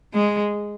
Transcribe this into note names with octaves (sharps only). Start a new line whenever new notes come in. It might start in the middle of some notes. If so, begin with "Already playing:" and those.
G#3